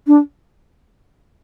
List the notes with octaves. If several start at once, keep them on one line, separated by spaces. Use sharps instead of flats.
D4